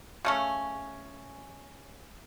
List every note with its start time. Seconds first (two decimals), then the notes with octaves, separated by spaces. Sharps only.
0.25 C#3 A3 C#4